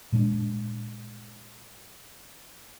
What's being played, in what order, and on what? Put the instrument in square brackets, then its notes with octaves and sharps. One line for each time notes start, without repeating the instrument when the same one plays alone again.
[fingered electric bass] A#2 G#3 C#4 D4